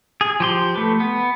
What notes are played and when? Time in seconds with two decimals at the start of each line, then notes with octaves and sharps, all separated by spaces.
0.21 G#4
0.40 F3 G4 C6
0.76 A3 B4
1.00 B3